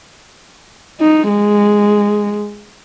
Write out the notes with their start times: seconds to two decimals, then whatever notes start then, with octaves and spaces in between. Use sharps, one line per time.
1.00 D#4
1.28 G#3